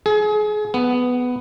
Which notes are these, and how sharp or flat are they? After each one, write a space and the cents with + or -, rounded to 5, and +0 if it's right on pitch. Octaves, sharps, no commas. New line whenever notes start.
G#4 +30
B3 +5